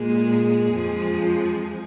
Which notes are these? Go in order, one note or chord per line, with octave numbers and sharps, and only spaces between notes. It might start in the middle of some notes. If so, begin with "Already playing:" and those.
Already playing: A#2 G#3 G#4
F2 F3 G#3